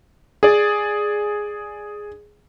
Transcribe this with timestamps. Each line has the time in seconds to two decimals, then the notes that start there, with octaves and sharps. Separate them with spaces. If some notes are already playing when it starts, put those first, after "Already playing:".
0.43 G#4 D5